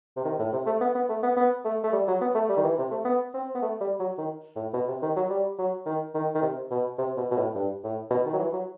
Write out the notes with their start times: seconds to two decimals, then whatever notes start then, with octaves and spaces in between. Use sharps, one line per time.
0.17 C3
0.25 D#3
0.39 A2
0.52 C3
0.66 A3
0.80 B3
0.95 B3
1.09 A3
1.23 B3
1.36 B3
1.65 A3
1.84 A3
1.93 G3
2.08 F#3
2.21 B3
2.35 A3
2.49 G3
2.57 D#3
2.64 E3
2.78 C3
2.91 A3
3.05 B3
3.34 C4
3.55 B3
3.62 A3
3.81 G3
4.00 F#3
4.18 D#3
4.56 A2
4.74 B2
4.88 C3
5.02 D#3
5.16 F#3
5.30 G3
5.59 F#3
5.86 D#3
6.14 D#3
6.34 D#3
6.42 C3
6.71 B2
6.98 C3
7.17 B2
7.31 B2
7.37 A2
7.55 G2
7.84 A2
8.10 B2
8.25 D#3
8.33 F#3
8.39 E3
8.53 F#3